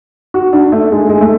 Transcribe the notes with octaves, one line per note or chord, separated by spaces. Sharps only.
F#4
D4
A3
G#3
G#3
A3